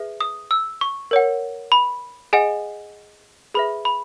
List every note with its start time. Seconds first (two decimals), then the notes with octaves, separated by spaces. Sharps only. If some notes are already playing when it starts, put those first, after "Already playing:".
Already playing: G#4 B4 E5
0.21 D#6
0.51 E6
0.81 C#6
1.11 A#4 C#5 F#5
1.72 B5
2.33 G#4 D#5 F#5 G#5
3.54 G#4 B4 E5 B5
3.85 B5